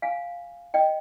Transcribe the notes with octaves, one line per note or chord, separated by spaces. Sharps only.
F5 G#5
D#5 G5